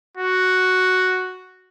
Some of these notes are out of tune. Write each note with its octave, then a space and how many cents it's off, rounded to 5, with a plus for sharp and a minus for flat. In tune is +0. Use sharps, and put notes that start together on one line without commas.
F#4 +0